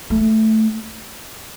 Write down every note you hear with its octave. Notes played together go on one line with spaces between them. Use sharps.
A3